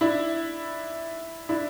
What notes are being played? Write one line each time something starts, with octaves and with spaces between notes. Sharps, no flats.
D4 E4
D4 E4